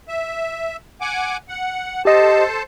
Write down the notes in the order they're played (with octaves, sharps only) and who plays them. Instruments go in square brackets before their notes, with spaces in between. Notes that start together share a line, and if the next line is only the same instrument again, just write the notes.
[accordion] E5
F#5 G#5 D6
F#5
[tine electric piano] G4 D#5 [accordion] A4 C5 A5